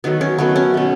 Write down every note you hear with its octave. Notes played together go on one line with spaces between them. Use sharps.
D#3 F#3 A3 B3
C#4
D#3 F#3 A3 B3
C#4
B2 A3